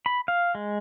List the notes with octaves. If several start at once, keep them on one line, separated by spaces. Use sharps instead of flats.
B5
F5
G#3